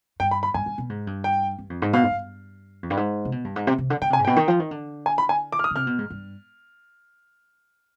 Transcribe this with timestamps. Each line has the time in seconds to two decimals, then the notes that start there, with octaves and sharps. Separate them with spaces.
0.20 G2 G5
0.31 B5
0.43 B5
0.54 G2 G#5
0.66 G2
0.78 B2
0.90 G#2
1.07 G2
1.24 G5
1.59 G2
1.70 F2
1.82 G#2
1.93 B2 F5
2.03 G#2
2.10 G2
2.83 F2
2.90 G2
2.97 G#2
3.25 C3
3.32 B2
3.44 G2
3.56 G#2
3.67 C3
3.78 C3
3.90 D3
4.02 D3 G5
4.10 C3 G#5
4.19 G#2
4.25 B2 G5
4.36 D#3
4.48 F3
4.60 D#3
4.71 D3
5.06 G#5
5.18 B5
5.29 G#5
5.52 D6
5.59 F6
5.64 D#6
5.71 D3
5.76 C3 F6
5.87 B2
5.98 G#2
6.10 G2